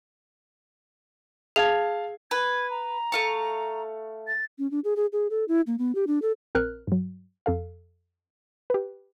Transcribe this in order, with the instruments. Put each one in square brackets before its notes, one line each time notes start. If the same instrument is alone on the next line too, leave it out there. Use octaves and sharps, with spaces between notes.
[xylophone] G#4 [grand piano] F5 A5 G#6
[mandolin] B4 [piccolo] G#6
[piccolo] A#5
[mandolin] A3 F5 C#6
[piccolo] A6
[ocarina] C#4
D4
G#4
G#4
G#4
A4
E4
A#3
B3
G4
D4
A4
[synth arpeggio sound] A#1 C4 A#4 F6 F#6
G2 F#3
F2 A4 F5
G4 B4